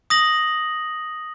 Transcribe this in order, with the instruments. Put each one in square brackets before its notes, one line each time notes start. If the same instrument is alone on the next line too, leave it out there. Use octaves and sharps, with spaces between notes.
[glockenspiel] D#6 A#6 F#7